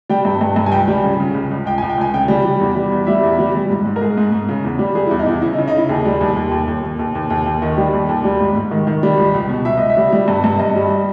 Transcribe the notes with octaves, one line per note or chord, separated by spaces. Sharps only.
G3 G5
G2
G2
G2
G#5
C#2 G5
G3
C#3
C#3
C#2
C#2
C#2 G5
G#5
C#2
G5
C#2 G#5
C#3 G5
G3
G3
E2
G3
E2
G3 E5
E2
G3
G3
G#2
G#2
A#4
G#2 G#4
G#2
G#2
C#3
E2
G3
G3 G#4
E4
E2
D#4
E2 E4
C#3 E4
D#4
C#3
D#4
C#3 E4
D#2 G#4
G3
D#2
D#2
D#2
D#2
D#2
D#2
D#2
D#2
D#2
D#3
G3 G4
D#2
D#2
G3
G#2
G#2
D#3
D#3
G3
C#2
C#2
B2
C#2 E5
C#2 D#5
E5
G3
G3
G2
G2
G2 D#5
G3